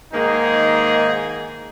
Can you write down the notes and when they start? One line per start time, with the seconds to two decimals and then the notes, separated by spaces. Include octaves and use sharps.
0.12 G#2 D#3 A#3 D#4 G#4